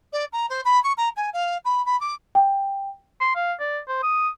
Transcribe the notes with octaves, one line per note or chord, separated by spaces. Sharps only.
D5
A#5
C5
B5
C#6
A#5
G#5
F5
B5
B5
D6
G5
C6
F5
D5
C5
D#6